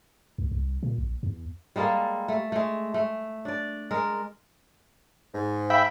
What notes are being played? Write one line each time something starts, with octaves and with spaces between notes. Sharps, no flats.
C#2
C2
A#2
A#1
E2
G3 G#3 A#3 A4
A3
G#3 A3
A3
D4 D5
G#3 A#4
G#2
E5 F5 G5 B5